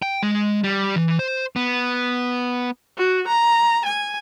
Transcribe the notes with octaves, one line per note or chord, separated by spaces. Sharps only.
G5
G#3
G3
E3
C5
B3
F#4
A#5
G#5